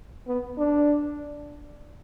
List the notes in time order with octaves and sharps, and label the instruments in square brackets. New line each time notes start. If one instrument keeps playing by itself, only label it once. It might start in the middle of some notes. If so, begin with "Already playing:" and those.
[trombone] B3
D4